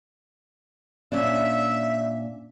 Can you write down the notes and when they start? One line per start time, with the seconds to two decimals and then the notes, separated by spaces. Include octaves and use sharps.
1.12 A#2 C#4 D4 E5